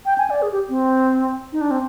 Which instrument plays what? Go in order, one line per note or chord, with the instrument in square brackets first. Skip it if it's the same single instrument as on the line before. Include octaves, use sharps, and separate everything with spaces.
[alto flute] G5
G#5
D5
G#4
G4
C4
D#4
D4
C4